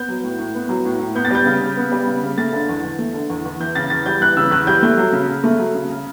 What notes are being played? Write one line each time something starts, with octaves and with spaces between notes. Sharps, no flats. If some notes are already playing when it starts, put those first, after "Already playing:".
Already playing: B3 G6
F#3
A2
A2
B3
F#3
A2
A2
B3 G6
A6
G3 G6
C#3
C#3
B3
G3
C#3
C#3
A3 A6
D3
E2
E2
A3
D3
E2
E2
E3 G6
C#3 A6
E2 A6
G3 G6
E3 F#6
C#3 E6
E2 F#6
G3 G6
A3 G6
F#3
C#3
C#3
A3
F#3
C#3
C#3